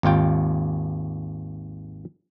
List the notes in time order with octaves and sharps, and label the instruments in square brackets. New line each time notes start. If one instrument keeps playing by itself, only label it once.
[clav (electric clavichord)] G#1 D#2 F4 G5